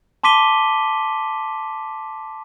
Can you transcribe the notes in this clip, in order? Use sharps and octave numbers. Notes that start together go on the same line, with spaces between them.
A5 C6 D6 B6 D#7 G7